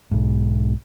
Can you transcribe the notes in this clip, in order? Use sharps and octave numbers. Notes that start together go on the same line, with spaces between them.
B1 G#2